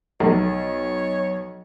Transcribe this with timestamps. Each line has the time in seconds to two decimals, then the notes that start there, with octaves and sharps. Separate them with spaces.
0.20 B1 C#5